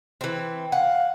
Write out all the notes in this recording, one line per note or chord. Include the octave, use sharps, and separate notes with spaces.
E3 C4
F5 F#5